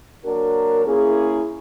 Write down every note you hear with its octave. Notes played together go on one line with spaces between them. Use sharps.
F#3 A#3 D4 F#4 A#4
A#3 C#4 E4 G#4